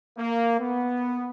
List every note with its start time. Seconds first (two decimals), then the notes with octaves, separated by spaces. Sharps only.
0.18 A#3
0.60 B3